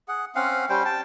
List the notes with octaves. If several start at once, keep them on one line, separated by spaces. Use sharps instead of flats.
G#4 F#5
C4 C#4 F5 F#5
G3 C#4 C5 G5
G5 A5